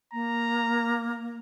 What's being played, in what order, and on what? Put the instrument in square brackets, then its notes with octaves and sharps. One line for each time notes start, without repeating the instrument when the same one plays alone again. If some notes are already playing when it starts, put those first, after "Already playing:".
[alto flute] A#3 [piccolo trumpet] A#5